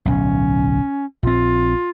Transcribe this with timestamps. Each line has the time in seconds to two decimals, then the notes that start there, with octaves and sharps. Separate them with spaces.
0.06 D1 B1 C#4
1.23 A#1 C4 F4